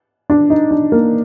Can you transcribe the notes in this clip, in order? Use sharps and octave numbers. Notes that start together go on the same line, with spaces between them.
D4
D#4
D4
A#3